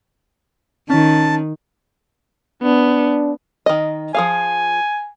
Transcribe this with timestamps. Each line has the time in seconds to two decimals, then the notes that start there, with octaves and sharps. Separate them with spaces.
0.90 D#3 C#4 A5
2.63 B3 D4
3.66 D#3 D#5
4.15 F3 G#4 F5 G#5